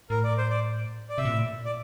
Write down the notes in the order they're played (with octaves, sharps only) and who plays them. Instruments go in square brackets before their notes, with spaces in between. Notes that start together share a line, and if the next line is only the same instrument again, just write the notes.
[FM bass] A2 [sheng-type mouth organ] A#4
[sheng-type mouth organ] D5
C5
D5
D5
[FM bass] C3 [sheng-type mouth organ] E5
[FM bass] A#2
A2
A#2
[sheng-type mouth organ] D5